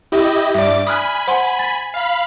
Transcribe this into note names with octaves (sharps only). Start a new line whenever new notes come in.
E4 G4 D#5
G2 D5 E5 D6
G#5 B5 D#6 F6 F#6
C5 F#5 C6
A6 B6
F5 B5